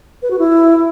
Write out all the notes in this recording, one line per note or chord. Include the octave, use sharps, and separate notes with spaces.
B4
F#4
E4